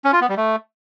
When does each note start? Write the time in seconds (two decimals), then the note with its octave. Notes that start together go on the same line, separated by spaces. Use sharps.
0.04 C#4
0.13 F4
0.21 B3
0.29 G3
0.37 A3